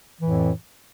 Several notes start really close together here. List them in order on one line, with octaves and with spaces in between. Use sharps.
E3 A2 F2